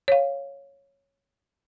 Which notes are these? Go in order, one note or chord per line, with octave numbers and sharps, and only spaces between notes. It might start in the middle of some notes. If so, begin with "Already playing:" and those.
C#5 F5